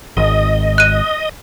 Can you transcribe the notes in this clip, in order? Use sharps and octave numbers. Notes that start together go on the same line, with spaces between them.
G#1 D#5
F#6 D#7